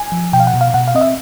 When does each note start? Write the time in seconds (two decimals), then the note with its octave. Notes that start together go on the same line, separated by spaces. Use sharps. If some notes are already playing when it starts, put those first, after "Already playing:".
Already playing: G#5
0.12 F3
0.33 B2 G5
0.40 F5
0.47 F#5
0.54 B2
0.61 F5
0.74 B2 F#5
0.88 F5
0.95 C4 D#5
1.01 E5